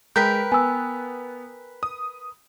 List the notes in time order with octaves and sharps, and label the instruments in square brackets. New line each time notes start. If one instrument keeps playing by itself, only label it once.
[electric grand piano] G#3 [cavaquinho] A#4 B4 G5 [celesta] G6 B6
[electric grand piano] B3 [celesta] G#5 E6
[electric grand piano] D#6